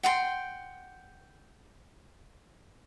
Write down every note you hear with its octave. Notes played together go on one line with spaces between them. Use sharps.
F#5 G5 C6